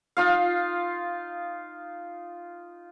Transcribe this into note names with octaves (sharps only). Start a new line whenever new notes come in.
D#4 F4 F5